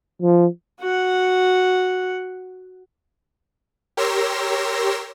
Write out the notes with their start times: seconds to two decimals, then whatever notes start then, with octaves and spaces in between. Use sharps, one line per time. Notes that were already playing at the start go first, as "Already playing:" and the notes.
0.22 F3
0.79 F#4 F#5
3.97 G4 A#4 C#5 C6 E6 A#6